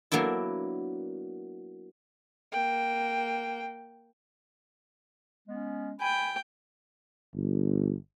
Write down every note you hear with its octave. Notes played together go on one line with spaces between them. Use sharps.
F#3 A#3 B3 D4 E4
A#3 G5
G#3 B3 C#4
G5 G#5 B5
G1